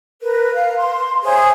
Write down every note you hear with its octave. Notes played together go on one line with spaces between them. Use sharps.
A#4 B4
F5
C6
G#4 C5 C#5 E5